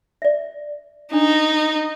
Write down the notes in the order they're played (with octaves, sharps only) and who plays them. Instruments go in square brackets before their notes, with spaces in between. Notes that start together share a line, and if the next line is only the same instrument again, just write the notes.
[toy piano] D5 E5
[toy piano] D4 [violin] D#4